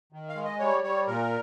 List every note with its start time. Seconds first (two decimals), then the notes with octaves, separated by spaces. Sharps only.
0.13 D#3
0.29 F5
0.36 G#3
0.45 D#5
0.59 G3 C#5
0.84 G3 C#5
1.07 A#2 A#4